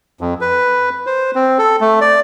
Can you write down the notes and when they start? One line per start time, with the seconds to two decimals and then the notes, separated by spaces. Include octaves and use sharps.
0.21 F2
0.41 B4
1.06 C5
1.35 C4
1.59 A4
1.81 A3
2.01 D5